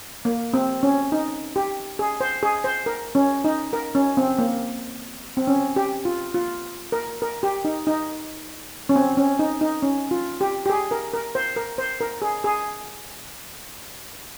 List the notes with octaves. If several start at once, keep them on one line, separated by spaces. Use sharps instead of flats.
A#3
C4
C#4
D#4
G4
G#4
C5
G#4
C5
A#4
C#4
D#4
A#4
C#4
C4
A#3
C4
C#4
G4
F4
F4
A#4
A#4
G4
D#4
D#4
C#4
C4
C#4
D#4
D#4
C#4
F4
G4
G4
G#4
A#4
A#4
C5
A#4
C5
A#4
G#4
G#4